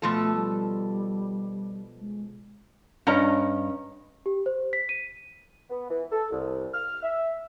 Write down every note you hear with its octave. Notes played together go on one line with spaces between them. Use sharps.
B2 F3 A3 A4
G3
G#3
G2 C#4 D#5 A#5
G4
C5
B6
D#7
B3
E3
A4
C2
F6
E5